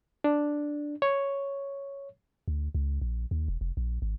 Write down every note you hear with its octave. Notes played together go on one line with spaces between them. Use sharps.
D4
C#5
D2
C#2
A#1
D#2
E1
F1
A#1
G#1